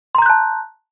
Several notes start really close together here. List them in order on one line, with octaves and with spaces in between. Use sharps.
C6 A#5 G6 F#6 A5